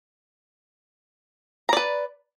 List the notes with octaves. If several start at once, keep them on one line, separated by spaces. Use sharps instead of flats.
B4 D5 A#5